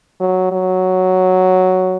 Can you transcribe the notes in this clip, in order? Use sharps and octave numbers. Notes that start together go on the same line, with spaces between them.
F#3
F#3